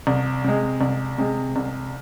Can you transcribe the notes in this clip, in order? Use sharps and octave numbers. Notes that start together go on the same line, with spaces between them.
C2
C3 G#3
C2
C3 G#3
C2